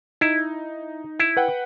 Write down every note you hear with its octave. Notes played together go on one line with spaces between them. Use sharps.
D#4 E4
E4
B4 F#5 G5